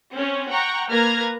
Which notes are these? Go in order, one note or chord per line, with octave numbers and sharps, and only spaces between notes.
C4 C#4 C#5
F#5 G5 A#5 C#6
A#3 B4 A#5 F6 G#6 A#6